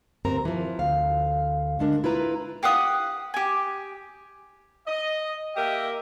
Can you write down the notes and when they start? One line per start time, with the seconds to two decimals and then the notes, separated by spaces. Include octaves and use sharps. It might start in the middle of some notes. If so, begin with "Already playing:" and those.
0.25 D2 G2 C4 A#4 A#5
0.45 E3 F3
0.79 D2 F5
1.79 D3 G#3 D4 A#4
2.04 E4 F4 B4 A#5
2.63 G4 F5 F#5 D#6
3.34 G4 G#5
4.87 D#5
5.56 A#3 G4 A#4 D#5 E5 G5